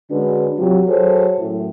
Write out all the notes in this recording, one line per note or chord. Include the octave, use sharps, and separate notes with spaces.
D3 G#3 C#4 D4 F#4 B4
C3 F#3 F4
F#3 F#4 G#4 A4 C5 C#5
F#2 A2